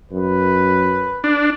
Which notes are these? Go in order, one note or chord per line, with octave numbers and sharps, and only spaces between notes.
F#2 B4
D4